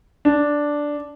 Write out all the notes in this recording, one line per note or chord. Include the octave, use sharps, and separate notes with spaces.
D4